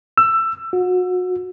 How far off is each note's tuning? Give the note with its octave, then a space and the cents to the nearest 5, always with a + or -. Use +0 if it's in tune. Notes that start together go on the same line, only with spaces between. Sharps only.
E6 +20
F#4 -30